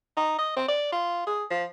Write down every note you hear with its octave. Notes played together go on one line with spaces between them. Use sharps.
D#4
D#5
C4
D5
F4
G#4
F3